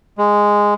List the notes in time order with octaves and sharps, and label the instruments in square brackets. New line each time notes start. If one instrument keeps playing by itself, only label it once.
[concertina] G#3